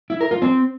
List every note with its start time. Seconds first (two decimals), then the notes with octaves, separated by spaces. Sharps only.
0.10 E4
0.21 A#4
0.31 F4
0.42 C4